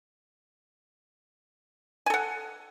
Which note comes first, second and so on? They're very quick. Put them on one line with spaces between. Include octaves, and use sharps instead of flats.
G#5 A4 F#5